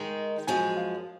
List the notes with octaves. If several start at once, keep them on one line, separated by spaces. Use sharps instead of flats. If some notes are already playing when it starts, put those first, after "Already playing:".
Already playing: D#3 G#3 D#4
F#2 F3 G#3 G#5
F5